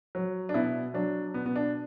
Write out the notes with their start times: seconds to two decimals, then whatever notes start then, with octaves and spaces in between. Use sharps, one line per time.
0.15 F#3
0.49 D4
0.54 B2 B3 E4
0.94 F#3 D4
1.34 B2 B3
1.46 B3
1.56 D4